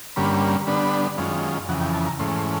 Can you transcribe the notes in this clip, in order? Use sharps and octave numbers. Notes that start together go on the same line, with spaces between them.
G2 D3 G3 A#3 C#4 B5
D3 G3 B3 D4 B5
F#2 D#3 G#3 C#4 F4
F2 C#3 E3 F#5
G5
A5
A#5
G#2 E3 A3 C#4 C6
C6